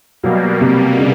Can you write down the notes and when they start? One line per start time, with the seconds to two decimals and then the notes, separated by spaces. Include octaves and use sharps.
0.23 B2 F#3 G3 A#3
0.61 C3
0.99 C#3